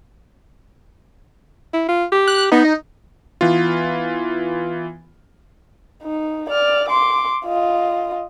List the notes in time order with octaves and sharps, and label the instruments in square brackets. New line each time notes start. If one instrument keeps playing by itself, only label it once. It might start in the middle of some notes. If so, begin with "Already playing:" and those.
[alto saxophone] E4
F4
G4
[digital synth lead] F#6
[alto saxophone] B3 [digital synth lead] D#4
[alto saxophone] D#5
[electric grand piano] E3 B3 F4
[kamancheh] D#4
D5 F6
C6 D6
F4 D#5